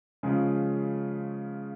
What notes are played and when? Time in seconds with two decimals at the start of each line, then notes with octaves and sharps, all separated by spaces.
0.23 C#3 F3 G#3 C#4 F4